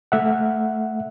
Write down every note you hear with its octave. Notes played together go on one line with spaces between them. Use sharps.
A3 E5 F#5